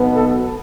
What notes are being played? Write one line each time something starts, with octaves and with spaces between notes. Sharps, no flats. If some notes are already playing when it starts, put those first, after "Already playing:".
Already playing: B1 B2 B3
A4